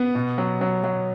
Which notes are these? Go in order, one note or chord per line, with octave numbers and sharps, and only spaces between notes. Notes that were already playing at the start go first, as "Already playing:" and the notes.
Already playing: B3
B2
F#3
F#3
F#3